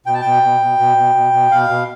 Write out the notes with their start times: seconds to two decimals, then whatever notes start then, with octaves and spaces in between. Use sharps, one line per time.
0.06 B2 G5
0.14 A5
0.21 B2 G5
0.43 B2
0.61 B2
0.79 B2
0.97 B2
1.15 B2
1.33 B2
1.51 B2 F5
1.69 B2